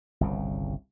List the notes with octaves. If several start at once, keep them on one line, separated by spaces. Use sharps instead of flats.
G1 C2 C#3